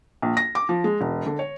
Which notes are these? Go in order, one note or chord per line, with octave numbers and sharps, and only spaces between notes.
A#1
A#6
D6
F3
G#3
E1
D3
C#5